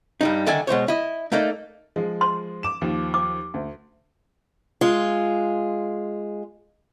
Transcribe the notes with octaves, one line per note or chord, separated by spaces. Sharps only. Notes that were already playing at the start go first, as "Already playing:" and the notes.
G2 G3 D#4
D3 D#3 D5 E5 G#5
B2 G#3 C5 C#5
E4 D#5
A3 A#3 D#4 D5
F3 G#3
C6
D6 E7
D#2 F3
D6
D2
G#3 F4